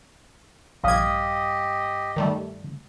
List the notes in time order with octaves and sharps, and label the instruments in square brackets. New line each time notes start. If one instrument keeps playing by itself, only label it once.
[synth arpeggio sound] A#1 G#6 [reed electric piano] G2 F5 D#6 [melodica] G4 D#5
[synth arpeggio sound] D#3 G3 A3